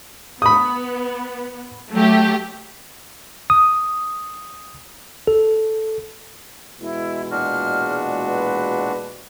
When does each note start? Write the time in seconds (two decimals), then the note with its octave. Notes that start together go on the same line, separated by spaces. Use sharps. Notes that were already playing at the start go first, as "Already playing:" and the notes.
0.42 B3 B5 D#6
1.92 F#3 A3 G4
3.50 D#6
5.27 A4
6.81 B2 E3 G#3 E4
7.31 A#2 D4 F#4 F6
8.26 B4